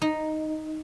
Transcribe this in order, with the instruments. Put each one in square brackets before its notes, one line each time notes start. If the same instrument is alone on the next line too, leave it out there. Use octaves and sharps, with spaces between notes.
[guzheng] D#4